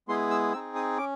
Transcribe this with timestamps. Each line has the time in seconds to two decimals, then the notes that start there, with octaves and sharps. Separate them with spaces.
0.08 G#3 B3 E4 G#4 C6
0.30 E6
0.53 C4 D#4 G#4 E6
0.76 D#6
0.98 C#4 D6